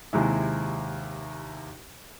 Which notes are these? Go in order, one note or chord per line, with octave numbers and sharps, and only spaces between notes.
D#2 C3 G#3 E4